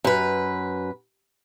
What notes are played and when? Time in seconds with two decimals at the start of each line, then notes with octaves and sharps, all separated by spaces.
0.04 F#2 B4